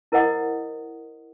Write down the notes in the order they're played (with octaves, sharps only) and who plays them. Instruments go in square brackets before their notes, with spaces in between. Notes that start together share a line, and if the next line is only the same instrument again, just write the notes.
[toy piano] E4 A#4 C5 D#5 F#5 D#6